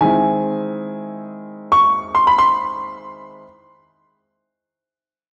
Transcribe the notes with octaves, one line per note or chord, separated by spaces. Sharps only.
D#3 G#3 C4 E4 G#5
C#6
C6
B5
C6